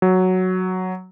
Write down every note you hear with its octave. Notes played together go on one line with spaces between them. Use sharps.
F#3